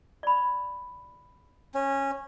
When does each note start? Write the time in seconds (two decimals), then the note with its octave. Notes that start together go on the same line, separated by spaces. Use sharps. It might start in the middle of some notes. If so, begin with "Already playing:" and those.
0.23 D5 B5
1.74 C#4